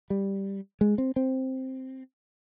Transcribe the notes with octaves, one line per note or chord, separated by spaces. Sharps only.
G3
G#3
C4
C4